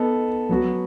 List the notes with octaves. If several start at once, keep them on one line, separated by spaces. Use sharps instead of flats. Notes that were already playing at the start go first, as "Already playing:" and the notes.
Already playing: B3 D#4 A4
F#3 B3 F#4